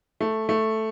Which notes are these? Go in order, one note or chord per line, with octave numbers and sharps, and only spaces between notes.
A3
A3